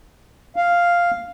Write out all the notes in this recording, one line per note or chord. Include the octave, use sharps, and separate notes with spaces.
F5